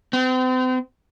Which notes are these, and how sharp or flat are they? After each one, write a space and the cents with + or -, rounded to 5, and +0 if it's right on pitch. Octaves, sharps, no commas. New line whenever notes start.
C4 -40